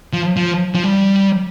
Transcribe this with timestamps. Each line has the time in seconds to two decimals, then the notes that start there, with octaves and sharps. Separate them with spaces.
0.13 F3
0.37 F3
0.75 F3
0.83 G3